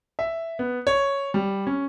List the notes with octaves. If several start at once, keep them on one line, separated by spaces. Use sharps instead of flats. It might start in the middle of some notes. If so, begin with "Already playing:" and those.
E5
B3
C#5
G3
C#4